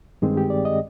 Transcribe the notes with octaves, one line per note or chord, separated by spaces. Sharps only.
G2 D#3 G#3 C4 G#4
G4
D5
D#5